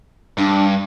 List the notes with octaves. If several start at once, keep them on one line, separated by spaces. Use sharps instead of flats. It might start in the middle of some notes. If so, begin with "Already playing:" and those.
G2 D4